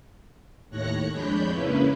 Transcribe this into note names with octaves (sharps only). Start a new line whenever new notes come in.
D#2 A2 C#5 F#6 A#6 C#7
F2 G#3 D4 C#5 B5 G6
C#3 A#3 C#4 E4 B4